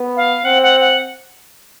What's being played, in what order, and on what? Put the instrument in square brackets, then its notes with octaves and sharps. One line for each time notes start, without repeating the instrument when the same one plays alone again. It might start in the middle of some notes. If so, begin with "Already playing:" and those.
Already playing: [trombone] B3
[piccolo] F5
[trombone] C4 [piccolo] F#5
[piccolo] F#5
F#5